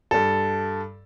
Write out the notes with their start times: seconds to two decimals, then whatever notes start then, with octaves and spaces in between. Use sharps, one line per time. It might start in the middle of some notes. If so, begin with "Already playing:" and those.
0.11 G2 A4